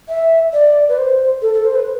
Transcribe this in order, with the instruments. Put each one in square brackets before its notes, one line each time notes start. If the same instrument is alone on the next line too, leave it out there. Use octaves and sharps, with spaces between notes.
[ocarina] E5
D5
B4
C5
A4
A4
C5
B4